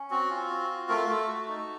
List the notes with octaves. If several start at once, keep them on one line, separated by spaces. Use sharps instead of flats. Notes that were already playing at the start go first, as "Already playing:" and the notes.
Already playing: C#4
C4 F#4
F4
C4
F4
A3 A#4
A4
F#4
A3 A4
F#4
D#4